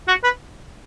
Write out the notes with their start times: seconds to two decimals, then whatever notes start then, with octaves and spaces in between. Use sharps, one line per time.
0.08 F#4
0.24 B4